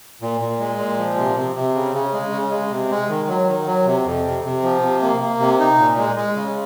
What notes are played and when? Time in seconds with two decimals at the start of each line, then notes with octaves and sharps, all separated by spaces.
0.22 A#2
0.41 A#2
0.60 G#3
0.78 A#2
0.99 F3
1.17 C3
1.37 C3
1.55 C3
1.75 C#3
1.94 C#3
2.13 G#3
2.32 C#3
2.51 G#3
2.71 C3
2.91 G#3
3.09 D#3
3.28 F#3
3.48 D#3
3.67 F#3
3.86 C3
4.05 F2
4.25 C3
4.44 C3
4.64 F3
4.83 C3
5.02 A#3
5.21 A#3
5.40 C3
5.59 D#4
5.78 A#2
5.98 G#3
6.16 G#3
6.36 C#3